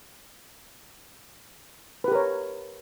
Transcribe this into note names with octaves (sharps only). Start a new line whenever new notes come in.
G4 A#4 B4 C#5